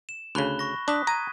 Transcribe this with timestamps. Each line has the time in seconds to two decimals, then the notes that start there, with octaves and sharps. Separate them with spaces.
0.09 E7
0.35 D2 C#3 B5 F#6 G7
0.59 C#6 A#6
0.88 D4 D#6 F#6 B6
1.07 A#5 G#6 D#7